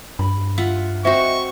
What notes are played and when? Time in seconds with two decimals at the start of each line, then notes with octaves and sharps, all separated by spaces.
0.19 G2 B5
0.58 F4 E5 F#5
1.05 C4 F#4 C5 D#5 E5 C#6